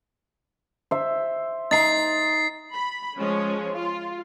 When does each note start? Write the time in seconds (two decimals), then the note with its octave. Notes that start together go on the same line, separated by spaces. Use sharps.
0.91 C5 E5
1.71 D#4 A#5 A6 C7
2.73 B5
3.17 F3 G#3 C#4 C#5
3.72 F4